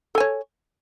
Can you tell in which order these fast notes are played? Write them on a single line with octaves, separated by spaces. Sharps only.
A4 G#5 C#5